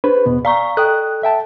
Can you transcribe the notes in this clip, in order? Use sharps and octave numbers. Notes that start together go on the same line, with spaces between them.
D4 B4 C5
E2 B2 B3
D5 F5 A#5 C#6
A4 G5 D#6 F#6
E5 G5 A5